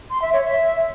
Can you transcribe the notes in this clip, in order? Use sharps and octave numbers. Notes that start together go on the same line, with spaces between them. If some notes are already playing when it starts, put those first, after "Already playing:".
C6
E5
C#5
E5